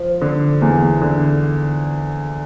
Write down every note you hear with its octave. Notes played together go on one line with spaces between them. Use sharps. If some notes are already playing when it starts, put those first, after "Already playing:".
Already playing: F3
D3
E2
D3